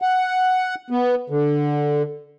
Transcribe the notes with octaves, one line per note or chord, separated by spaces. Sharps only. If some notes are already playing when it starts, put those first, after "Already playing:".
F#5
B3
D3